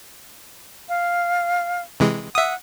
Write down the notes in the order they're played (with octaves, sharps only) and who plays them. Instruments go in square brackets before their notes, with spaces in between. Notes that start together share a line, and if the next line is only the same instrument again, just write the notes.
[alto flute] F5
[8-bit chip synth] C3 E3 G#3
[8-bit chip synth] E5 D#6 [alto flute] F#5